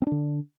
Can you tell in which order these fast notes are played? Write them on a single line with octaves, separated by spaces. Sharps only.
C4 D4 D3